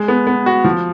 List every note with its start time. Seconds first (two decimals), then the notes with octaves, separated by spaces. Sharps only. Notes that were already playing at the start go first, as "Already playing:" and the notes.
Already playing: G#3
0.08 B3
0.27 B3
0.46 F#4
0.64 F3